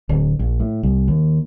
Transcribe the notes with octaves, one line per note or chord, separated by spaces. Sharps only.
D1
A#1
A2
C2
D#2